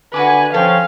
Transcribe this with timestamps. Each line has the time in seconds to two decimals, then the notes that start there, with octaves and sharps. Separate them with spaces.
0.14 D3 F#4 B4 G#5 B5 D6
0.54 F3 C#4 A4 F5 G5